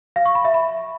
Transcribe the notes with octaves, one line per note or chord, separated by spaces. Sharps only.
F5
C#6
B5
E5
B5